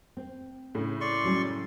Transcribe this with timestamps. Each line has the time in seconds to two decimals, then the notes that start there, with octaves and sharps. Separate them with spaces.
0.17 C4
0.75 A2 C#3 A3
1.01 D5 C6 C#6
1.24 F#3 G3 C#4